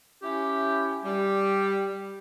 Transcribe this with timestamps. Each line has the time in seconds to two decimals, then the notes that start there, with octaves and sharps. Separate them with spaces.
0.23 C#4 E4 G4
1.04 G3